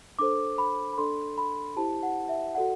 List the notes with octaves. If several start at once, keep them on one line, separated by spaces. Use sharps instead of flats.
D4 A4 C5 D6
B5
B5
D4 A4 D5 C6
B5
E4 G4 C5 A5
F#5
E5
F#4 A4 D5 F#5